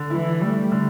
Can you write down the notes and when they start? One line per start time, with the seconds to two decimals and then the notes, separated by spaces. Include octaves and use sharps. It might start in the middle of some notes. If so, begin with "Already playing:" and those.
Already playing: D3
0.10 E3 E4
0.41 G3 A3
0.72 D3